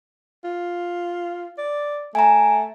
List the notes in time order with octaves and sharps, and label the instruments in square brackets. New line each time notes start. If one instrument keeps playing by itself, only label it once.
[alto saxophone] F4
D5
[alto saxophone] A3 [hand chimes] G#5 A#5